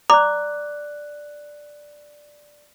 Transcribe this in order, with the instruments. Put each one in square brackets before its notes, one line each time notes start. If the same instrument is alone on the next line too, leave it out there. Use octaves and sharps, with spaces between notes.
[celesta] D5 F#6 [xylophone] A#5 [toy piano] D6